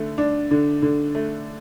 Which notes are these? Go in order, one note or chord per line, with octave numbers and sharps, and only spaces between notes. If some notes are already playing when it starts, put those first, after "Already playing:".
Already playing: D3 A3
D4
D3
D3
A3